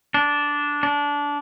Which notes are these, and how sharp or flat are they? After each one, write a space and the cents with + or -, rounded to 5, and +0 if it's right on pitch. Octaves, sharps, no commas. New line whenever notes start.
D4 -10
D4 -20